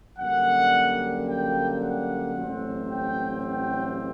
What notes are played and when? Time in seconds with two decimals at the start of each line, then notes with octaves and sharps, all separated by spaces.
0.18 F#2 D3 G3 A#3 F#5
1.28 G5
1.82 F#5
2.35 A1 G2 F#3 A3 C4
2.90 G5
3.44 G5